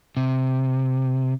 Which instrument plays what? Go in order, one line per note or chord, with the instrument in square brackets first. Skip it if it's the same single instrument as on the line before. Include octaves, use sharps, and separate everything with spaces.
[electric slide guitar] C3